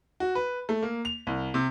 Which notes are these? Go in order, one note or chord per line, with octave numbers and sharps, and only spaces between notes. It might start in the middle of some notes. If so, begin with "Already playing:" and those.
F#4
B4
A3
A#3
F7
C2
C3